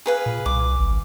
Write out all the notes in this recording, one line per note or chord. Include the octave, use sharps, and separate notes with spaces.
G#4 B4 F5
A#2
C2 D6
G#1
G#1